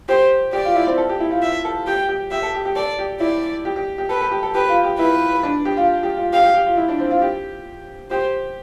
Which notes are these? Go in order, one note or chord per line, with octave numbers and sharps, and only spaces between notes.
G4 C5
G4 D5
F4
E4
C4
A4
G4
E4
F4
E5
A4
G4 G5
G4
G4 E5
A4
G4
G4
A4 D5
G4
E4 D5
G4
G4
G4
A4 B4
A4
G4
A4
G4 B4
F4
G4
E4 B4
D4
G4
F4
G4
F4
G4 F5
G4
G4
F4
E4
D4
C4
F4
G4
G4 C5